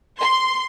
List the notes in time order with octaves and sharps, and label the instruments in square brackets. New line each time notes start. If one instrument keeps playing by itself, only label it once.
[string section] C6